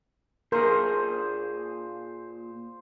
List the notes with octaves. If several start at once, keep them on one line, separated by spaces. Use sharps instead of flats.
A#2 G#4 A#4 C5